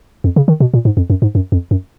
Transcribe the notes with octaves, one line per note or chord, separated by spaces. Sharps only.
F2
C#3
D#3
B2
A#2
G#2
F2
F#2
G#2
F#2
F2
F#2